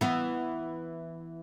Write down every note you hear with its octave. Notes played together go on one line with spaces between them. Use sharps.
E3 B3